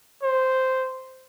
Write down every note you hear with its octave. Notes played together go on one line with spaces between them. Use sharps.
C5